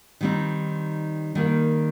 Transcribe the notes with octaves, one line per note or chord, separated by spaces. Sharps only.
D#3 G3 C4 D#4
D#3 G3 A#3